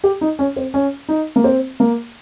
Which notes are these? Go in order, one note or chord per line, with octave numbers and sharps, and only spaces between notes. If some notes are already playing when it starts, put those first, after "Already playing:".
G4
D#4
C#4
C4
C#4
D#4
A#3
C4
A#3